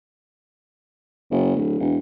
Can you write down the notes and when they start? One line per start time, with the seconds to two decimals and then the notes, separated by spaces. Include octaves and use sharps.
1.31 F#1
1.56 D1
1.80 E1